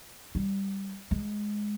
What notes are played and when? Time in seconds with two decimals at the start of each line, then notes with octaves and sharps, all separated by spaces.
0.35 G3
1.11 G#3